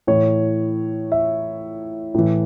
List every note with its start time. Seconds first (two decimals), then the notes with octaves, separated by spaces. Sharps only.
0.07 A2 E3 C#5
1.12 E5
2.14 A2 E3